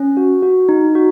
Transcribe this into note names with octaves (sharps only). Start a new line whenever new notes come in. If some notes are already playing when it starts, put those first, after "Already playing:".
Already playing: C#4
F#4
F#4
D#4
F#4